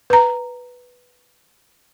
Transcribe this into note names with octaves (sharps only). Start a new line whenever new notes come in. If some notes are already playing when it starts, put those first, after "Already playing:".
B4 A#5